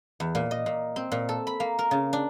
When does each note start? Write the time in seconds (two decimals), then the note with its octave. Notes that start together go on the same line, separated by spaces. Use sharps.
0.20 E2
0.35 A#2
0.51 D#5
0.66 A#2
0.96 C4
1.12 A#2
1.29 A4
1.47 B5
1.60 A#3
1.79 A#4
1.91 C#3
2.13 D4